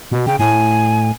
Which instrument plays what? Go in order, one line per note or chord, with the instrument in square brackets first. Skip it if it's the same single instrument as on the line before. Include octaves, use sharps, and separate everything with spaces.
[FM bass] B2
[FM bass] C#3 [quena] G5
[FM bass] A2 [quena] G#5